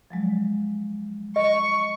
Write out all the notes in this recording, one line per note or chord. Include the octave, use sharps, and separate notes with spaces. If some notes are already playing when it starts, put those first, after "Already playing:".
F3 F#3 G#3
D#5 C#6